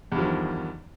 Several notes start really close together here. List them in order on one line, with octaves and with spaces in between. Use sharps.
E2 G2 F3 D#3